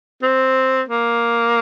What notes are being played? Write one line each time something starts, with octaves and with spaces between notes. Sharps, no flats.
C4
A#3